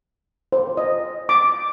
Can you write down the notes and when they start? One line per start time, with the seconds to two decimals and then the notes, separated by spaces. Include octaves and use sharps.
0.52 C5
0.77 D#5
1.29 D6